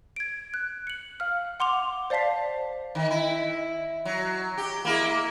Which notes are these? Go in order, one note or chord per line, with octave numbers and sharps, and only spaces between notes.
G#6 D7
F#6
C#7 F#7
F5 F6
F#5 C6 D6 F7
C5 D5 F5 A5 B6 C7
D#3
E4
F#3
G4
A#3 E4 G#4